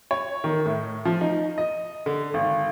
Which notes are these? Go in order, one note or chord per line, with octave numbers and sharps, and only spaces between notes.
C#5
D#3
A2
F3
D#4
D#5
D3
G#1